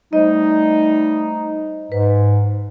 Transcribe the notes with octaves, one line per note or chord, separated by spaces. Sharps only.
G3 A3 D#4 C5 D#5
G#2 B4